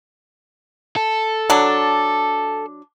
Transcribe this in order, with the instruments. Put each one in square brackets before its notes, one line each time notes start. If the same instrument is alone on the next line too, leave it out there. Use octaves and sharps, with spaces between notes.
[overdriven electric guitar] A4
[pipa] F#3 D4